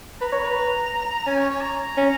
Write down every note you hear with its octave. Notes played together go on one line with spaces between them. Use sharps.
B4 A#5
C#5
B4
C#4 G#5
C#5
C#5
A#5
C#4